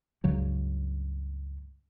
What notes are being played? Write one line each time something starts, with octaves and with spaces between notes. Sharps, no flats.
C#2 G2 C#3 F#3